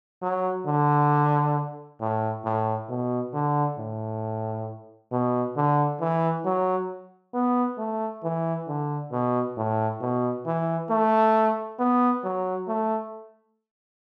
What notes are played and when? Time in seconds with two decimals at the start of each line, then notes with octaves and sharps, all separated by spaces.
0.22 F#3
0.67 D3
2.00 A2
2.45 A2
2.89 B2
3.34 D3
3.78 A2
5.12 B2
5.56 D3
6.00 E3
6.45 F#3
7.34 B3
7.78 A3
8.23 E3
8.68 D3
9.12 B2
9.57 A2
10.01 B2
10.46 E3
10.90 A3
11.79 B3
12.24 F#3
12.68 A3